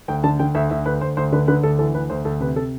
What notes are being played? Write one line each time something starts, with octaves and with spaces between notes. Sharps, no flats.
D2 G5
D3 A5
D3 G5
D2 E5
D2 E5
D2 B4
D2 C5
D2 C5
D3 B4
D3 B4
D2 A4
E3 A4
D2 B4
D2 C5
D2 A4
C3 B4
C3 A4